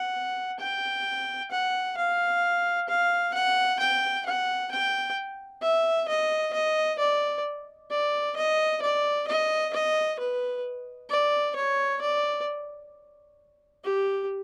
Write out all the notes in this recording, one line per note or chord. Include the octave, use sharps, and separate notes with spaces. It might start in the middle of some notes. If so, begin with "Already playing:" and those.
Already playing: F#5
G5
F#5
F5
F5
F#5
G5
F#5
G5
E5
D#5
D#5
D5
D5
D#5
D5
D#5
D#5
B4
D5
C#5
D5
G4